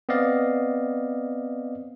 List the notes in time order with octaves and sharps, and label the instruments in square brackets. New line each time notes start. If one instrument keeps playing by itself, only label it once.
[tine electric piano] B3 C4 D5 D#5 F5